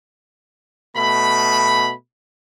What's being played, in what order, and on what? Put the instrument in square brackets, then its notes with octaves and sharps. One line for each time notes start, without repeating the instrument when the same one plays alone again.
[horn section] B2 A3 B5